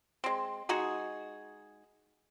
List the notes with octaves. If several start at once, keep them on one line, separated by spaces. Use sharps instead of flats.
G#3 C4
G#3 D#4 F#4 G#4